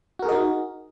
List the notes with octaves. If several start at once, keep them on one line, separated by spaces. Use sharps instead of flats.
D#4 F#4 G#4 A#4 D#5